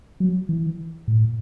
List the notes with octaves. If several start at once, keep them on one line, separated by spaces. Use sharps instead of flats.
F#3
E3
A2